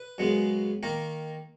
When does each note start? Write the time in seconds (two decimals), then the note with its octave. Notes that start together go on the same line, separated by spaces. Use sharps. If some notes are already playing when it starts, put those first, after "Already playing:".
Already playing: B4
0.18 F#2 C#3 G#3 B3
0.83 D#3 A#3 A#4